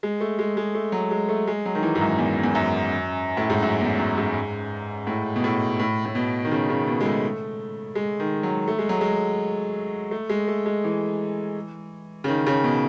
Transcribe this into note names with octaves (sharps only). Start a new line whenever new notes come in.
G#3
A3
G#3
G#3
A3
F#3
G#3
A3
G#3
F#3
D#3
E3
G#2
F#2
E2
E2
F#2
A2
G#2
F#2
E2
F#2
G#2
A2
B2
A2
A2
A2
B2
D#3
C#3
C#3
B2
G#3
A3
G#3
D#3
F#3
A3
G#3
F#3
G#3
A3
G#3
A3
G#3
E3
C#3
D#3
C#3
B2